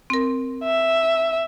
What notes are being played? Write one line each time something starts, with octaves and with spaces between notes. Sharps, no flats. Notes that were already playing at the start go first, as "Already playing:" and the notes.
C4 A#4
E5